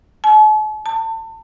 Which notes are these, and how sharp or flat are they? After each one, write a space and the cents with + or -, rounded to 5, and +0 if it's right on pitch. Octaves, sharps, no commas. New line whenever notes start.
A5 -45
A5 +30